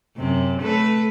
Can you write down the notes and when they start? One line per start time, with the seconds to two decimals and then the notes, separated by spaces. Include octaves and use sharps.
0.16 F#2 C3
0.61 A3 A4 B4